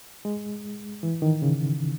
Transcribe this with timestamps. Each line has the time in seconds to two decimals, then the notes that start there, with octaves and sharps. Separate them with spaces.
0.25 G#3
1.03 E3
1.22 D#3
1.42 C#3